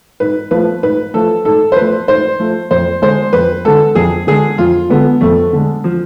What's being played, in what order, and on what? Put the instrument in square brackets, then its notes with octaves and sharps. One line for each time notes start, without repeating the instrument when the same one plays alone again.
[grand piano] G#2 [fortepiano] B4
[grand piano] F3 A3 [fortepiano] B4
[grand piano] G#2 [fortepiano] B4
[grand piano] F3 A3 [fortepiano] A4
[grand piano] G#2 [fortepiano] A4
[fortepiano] C5
[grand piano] F3 A3 [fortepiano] B4
[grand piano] G#2 [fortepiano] C5
[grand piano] F3 A3
[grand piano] F2 [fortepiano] C5
[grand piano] D3 G#3 [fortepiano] C5
[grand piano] F2 [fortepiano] B4
[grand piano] D3 G#3 [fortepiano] A4
[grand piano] F2 [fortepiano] G#4
[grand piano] D3 G#3 [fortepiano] G#4
[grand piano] F2 [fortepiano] F4
[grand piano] D3 G#3 [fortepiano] B3
[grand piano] F2 [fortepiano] A3
[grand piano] D3 G#3
[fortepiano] F3